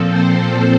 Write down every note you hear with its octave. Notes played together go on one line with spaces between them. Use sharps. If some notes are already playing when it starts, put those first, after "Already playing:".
Already playing: A#2 F3 C4 A4
C5
A4